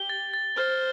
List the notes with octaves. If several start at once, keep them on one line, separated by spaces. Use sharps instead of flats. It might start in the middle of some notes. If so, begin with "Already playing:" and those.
Already playing: G4 G7
A6
A6
C5 F6